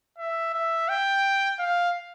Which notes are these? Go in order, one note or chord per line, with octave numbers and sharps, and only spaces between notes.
E5
E5
G5
F5